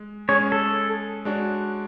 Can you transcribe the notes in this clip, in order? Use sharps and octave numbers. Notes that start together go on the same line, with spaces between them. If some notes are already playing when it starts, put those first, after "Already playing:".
Already playing: G#3
G#3 C#4 G#4 C#5
A4
G#3 D4 F#4 C#5